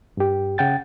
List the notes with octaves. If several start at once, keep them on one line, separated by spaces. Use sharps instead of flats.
G2 G4
C#3 F#5 G5 A6